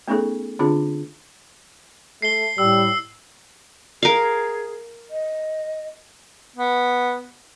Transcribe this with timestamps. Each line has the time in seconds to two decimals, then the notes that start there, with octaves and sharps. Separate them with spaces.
0.08 A3 B3 C#4 D#4 G#4 A4
0.59 D3 C4 D4 F4 G#4
2.22 A3 C7 G7
2.58 A2 G3 E6
4.03 G#4 A#4 F5
5.10 D#5
6.56 B3